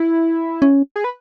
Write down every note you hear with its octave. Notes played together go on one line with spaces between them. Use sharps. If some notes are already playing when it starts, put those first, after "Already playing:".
Already playing: E4
C#4
G#4
B4